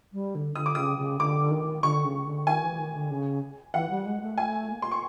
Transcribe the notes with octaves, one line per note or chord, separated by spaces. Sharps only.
G3
D3
D3 D#6
D6
C#3 D#6
C#3
D3 D6
D#3
D3 C#6
C#3
D3
D#3 G#5
E3
D#3
D3
C#3
E3 F#5
G3
G#3
A3
A3 G#5
A#3
C6
C#6